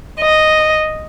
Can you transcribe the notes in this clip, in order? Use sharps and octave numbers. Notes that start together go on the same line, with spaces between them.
D#5